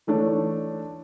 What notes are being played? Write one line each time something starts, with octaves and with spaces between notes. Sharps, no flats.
E3 A3 D4 C#5